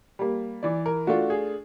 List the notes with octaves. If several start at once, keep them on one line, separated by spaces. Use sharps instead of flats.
G3 A#3
E3 D5
A#4
A3 D4 F4 F#4
G#4